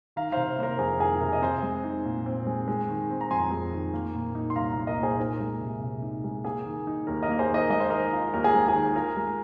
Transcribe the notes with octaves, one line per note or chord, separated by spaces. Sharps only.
D#3 F5 A#5
C3 C5 F5
A#3 A#4 C5
F2 G#4
D#3 G#4
C3 A#4
D#5
C4 G#4 C5
G#3
D#4
A#2
C4
G#3
G#3
D#3
C4
A#5
F2 G#5 C6
G#3
D#3
A#3
A#2
D#4
C6
C2 F5 A#5
F5 A#5
A#3
A#4 D#5
A#2
G#4 C5
D#4 A#4
G#3
C3
C3
D#4
G#3
A#3 G#4
D#3
D#4
D#2 A#4
A#4 D#5
A#3
G#4 C5
D#3 A#4 D#5
G#3 D#5
C5
D#3 A#4 D#5
F4
D#2 A#4
G#4
G#3
G#4
D#3
F4 A#4
G#3